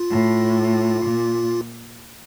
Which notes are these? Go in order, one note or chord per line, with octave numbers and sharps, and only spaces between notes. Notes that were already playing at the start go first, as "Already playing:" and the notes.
Already playing: F4
A2
A#2